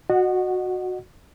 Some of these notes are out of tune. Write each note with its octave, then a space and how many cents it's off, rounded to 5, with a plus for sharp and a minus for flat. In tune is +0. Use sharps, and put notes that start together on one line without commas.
F#4 -15 D#5 -30 F#5 +10